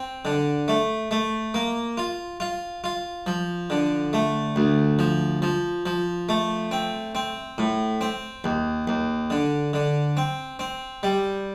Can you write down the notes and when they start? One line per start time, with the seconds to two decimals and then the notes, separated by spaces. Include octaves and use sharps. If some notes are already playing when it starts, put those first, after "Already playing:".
Already playing: C4
0.25 D3
0.68 A3
1.11 A3
1.54 A#3
1.97 F4
2.40 F4
2.84 F4
3.26 F3
3.70 D3
4.13 A3
4.56 D2
4.99 F3
5.42 F3
5.86 F3
6.29 A3
6.71 C4
7.15 C4
7.58 A2
8.01 C4
8.44 D#2
8.88 D#2
9.30 D3
9.73 D3
10.17 C4
10.59 C4
11.03 G3